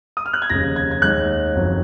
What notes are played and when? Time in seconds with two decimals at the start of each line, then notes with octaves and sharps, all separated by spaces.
0.17 D#6
0.26 F6
0.33 F#6
0.42 G#6
0.50 F1 D#2 C#3 A#6
0.76 G#6
0.91 G#6
1.02 D#2 D#3 G#3 F#6
1.55 F#1 F2 D#3 F#3